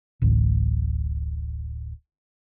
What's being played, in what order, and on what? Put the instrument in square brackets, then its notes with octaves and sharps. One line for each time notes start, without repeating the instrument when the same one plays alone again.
[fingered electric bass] D1 A1